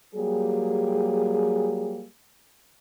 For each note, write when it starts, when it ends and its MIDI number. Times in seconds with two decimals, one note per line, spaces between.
0.15 2.05 54
0.15 2.05 55
0.15 2.05 58
0.15 2.05 67
0.15 2.05 68